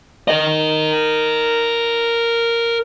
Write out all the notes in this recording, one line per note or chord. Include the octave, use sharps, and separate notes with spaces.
A#4 D#5